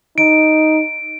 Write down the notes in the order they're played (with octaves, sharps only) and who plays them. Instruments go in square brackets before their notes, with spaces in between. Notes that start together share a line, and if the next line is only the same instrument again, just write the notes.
[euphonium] D#4 [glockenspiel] D7